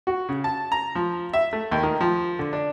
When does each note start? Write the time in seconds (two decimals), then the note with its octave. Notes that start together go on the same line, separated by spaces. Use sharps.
0.07 F#4
0.29 C#3
0.44 A5
0.72 A#5
0.95 F3
1.33 E5
1.53 A3
1.72 D#2
1.83 D#3
2.01 F3
2.39 D3
2.53 D4